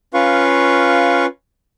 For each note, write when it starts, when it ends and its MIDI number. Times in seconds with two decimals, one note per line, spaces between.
0.14 1.26 61
0.14 1.26 65
0.14 1.26 71
0.14 1.26 77
0.14 1.26 85